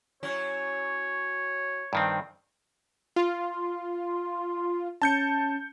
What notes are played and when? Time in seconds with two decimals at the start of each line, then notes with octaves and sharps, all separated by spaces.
0.23 F#3 C#4 E4 C#5
1.93 G2 D#3 C4
3.16 F4 C6
5.02 C#4 A5 G6 C#7